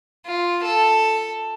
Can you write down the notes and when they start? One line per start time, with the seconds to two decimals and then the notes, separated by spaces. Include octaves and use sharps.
0.26 F4
0.64 A4